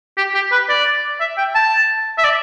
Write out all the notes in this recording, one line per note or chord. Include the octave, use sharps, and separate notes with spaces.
G4
G4
B4
D5
E5
G5
A5
E5
D5